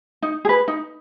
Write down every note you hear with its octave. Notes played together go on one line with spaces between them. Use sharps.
D#4
G#4
B4
D#4